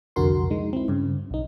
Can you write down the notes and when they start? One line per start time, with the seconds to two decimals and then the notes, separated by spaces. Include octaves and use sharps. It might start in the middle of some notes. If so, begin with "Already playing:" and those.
0.16 C2 F2 D3 F#4 A#4 C6
0.50 G#3 D#4
0.73 C4 E4
0.88 G2 C#3
1.31 B1 D#4